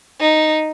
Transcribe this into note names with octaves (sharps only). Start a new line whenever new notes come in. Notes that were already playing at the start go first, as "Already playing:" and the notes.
D#4